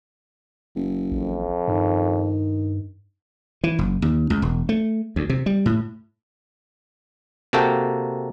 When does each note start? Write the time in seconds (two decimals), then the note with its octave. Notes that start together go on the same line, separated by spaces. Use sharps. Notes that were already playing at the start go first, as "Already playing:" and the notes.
0.75 F#1
1.12 A1 F2
1.68 G2 D#3
3.64 E3
3.79 F#1
4.02 D#2
4.30 C#2
4.42 E1
4.69 A3
5.16 D2
5.30 C3
5.46 G3
5.66 A2
7.53 C3 A#3 F#4 A4 G5